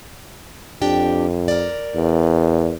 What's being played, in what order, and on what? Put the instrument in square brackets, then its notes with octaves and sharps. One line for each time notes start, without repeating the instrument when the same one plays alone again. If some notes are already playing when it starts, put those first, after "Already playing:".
[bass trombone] F2 [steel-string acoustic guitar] D4 G4 G5
[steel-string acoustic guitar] A#4 D5
[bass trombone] E2